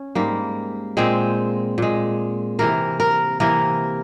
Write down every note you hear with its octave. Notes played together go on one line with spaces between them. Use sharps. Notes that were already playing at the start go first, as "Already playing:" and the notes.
Already playing: C#4
G#2 G3 A#3
A#2 G#3 C4
A#2 G#3
C3 E3 A#3 A#4
A#4
C3 E3 A#3 A#4